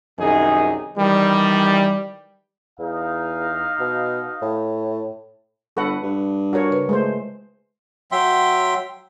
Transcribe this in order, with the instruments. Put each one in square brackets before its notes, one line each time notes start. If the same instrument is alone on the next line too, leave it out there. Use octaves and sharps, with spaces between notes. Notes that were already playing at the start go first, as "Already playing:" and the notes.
[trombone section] C2 F#2 D#3 D#4 G#4
D#3 E3 G3
[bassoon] E2 [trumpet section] D#4 F5
[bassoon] B2
A2
[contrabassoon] G1 [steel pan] A4 B4 F#5 [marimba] C#6
[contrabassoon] G2
[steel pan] F#4 A#4 C#5
[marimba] C#3 B4
[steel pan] G#3 A3 C5
[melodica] F#3 E5 G5 C6